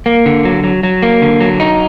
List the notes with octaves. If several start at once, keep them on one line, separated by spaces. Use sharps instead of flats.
A#3
D3
F#3
F#3
F#3
A#3
D3
F#3
D#4